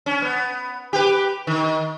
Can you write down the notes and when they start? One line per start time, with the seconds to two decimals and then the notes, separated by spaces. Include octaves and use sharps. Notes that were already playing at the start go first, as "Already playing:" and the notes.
0.06 C#4
0.22 B3
0.93 G4 B4
1.47 D#3